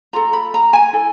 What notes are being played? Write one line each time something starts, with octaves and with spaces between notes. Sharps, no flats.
F4 A4 A#5
B5
A#5
G#5
E4 A4